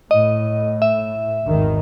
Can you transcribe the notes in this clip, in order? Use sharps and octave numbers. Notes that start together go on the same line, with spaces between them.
A2 D#5
E5
G#1 E2 D#3